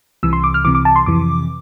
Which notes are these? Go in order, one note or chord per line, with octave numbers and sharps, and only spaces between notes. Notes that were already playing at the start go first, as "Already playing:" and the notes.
C2 C3 E3 E6
C6
D6
F6
C2 C3 E3 D6
D6
A5
C6
F2 C3 E3 D6